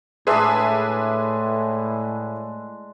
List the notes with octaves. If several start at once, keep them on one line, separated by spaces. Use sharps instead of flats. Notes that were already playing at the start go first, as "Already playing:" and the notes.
A2 G#3 D4 G#4 B4 E5